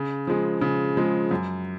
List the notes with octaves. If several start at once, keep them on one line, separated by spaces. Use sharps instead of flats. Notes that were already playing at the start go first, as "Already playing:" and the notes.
Already playing: C#3
F3 G#3
C#3
F3 G#3
F#2